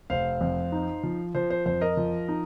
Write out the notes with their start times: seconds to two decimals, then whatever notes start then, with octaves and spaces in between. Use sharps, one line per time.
0.10 F1 C5 F5
0.41 F2
0.72 D#4
1.03 F3
1.35 F3 C5
1.50 C5
1.66 F2 C5
1.81 A#4 D#5
1.97 F3
2.29 D#4